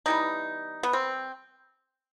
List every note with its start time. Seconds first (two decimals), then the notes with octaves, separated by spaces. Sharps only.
0.06 E3 G3 B3 D#4
0.83 B3
0.93 C4